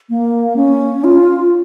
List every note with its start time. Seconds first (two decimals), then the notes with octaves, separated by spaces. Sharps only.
0.09 A#3
0.56 C#4
1.04 F4